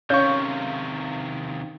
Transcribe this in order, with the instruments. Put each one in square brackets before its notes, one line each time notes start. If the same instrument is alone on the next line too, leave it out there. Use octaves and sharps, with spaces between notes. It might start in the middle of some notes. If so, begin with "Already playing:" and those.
[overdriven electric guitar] C3 D#3 [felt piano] C#4 F5 [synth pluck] C#5 [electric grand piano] C#6 G6